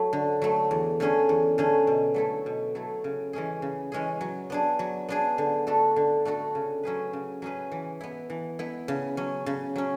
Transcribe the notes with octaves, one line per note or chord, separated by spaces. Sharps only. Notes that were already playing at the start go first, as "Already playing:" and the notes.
Already playing: F#3 A3
D3
F#3 A3
E2
D3 A3 C#4 G#4
E2
D3 A3 C#4 G#4
B2
F#3 A3 E4 A4
B2
F#3 A3 E4 A4
C#3
E3 G#3 C#4 G#4
C#3
E3 G#3 C#4 G#4
F#3
B3 D4 G#4
F#3
B3 D4 G#4
D3
A3 D4 F#4 A4
D3
A3 D4 F#4 A4
C#3
F#3 C#4 G#4 B4
C#3
F#3 C#4 G#4 B4
E3
B3 E4
E3
B3 E4
C#3
F#3 C#4
C#3
F#3 C#4